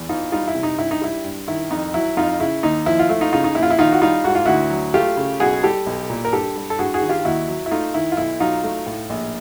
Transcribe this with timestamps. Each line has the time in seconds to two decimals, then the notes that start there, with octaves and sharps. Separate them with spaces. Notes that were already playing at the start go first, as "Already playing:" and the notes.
Already playing: E2
0.09 E3 D#4 F4
0.32 G3 D#4 F4
0.48 E4
0.55 C3
0.63 D#4
0.78 G2 E4
0.91 D#4
1.01 G3 E4
1.25 G2
1.48 D#3 E4
1.71 F2 D#4
1.94 F#3 E4
2.17 F2 D#4 F4
2.40 C#3 E4
2.63 D#2 D#4
2.86 F3 E4
2.99 F4
3.09 A3 E4
3.21 D#4 F4
3.32 C#3 D#4 F4
3.44 D#4
3.55 A#1 E4
3.63 F4
3.70 E4
3.79 D#3 D#4 F4
3.92 F#4
4.01 G3 D#4 F4
4.24 G#2 F#4
4.35 F4
4.46 D2 E4 F#4
4.71 F#3
4.94 A3 F4 G4
5.17 C#3
5.40 B1 F#4 G#4
5.63 G3 G4 A4
5.86 B1
6.10 A#2
6.25 A#4
6.33 G2 G4 A4
6.56 G3
6.70 A4
6.79 G2 F#4 G#4
6.94 F#4 G#4
7.02 D#3
7.09 F4 G4
7.25 D#2 E4 F#4
7.48 F#3
7.66 E4
7.71 A3 D#4 F4
7.94 D#3 E4
8.12 F4
8.17 B1 E4
8.40 F#3 D#4 F4
8.64 A3
8.87 A2
9.10 A#1